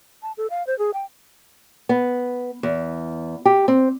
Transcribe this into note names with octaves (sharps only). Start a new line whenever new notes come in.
A5
A4
F5
C5
G#4
G5
B3
E2
G4
C4